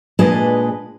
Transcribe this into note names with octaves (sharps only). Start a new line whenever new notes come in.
A#2 G#3 D4 G#4 B4 D#5